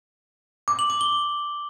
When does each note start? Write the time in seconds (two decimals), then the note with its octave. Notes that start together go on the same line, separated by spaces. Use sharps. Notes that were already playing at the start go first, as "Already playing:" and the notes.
0.68 D6
0.79 F#7
0.90 D6
1.01 G7